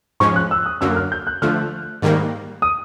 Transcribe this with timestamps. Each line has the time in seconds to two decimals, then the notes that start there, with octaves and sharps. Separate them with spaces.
0.20 G#2 F3 G#3 C#4 C#6
0.36 F#6
0.51 E6
0.66 D#6
0.81 F#2 D3 F#3 A#3 E6
0.96 F6
1.12 G6
1.27 F#6
1.42 D3 F3 A3 F6
2.02 G#2 D#3 G3 A#3
2.62 D#6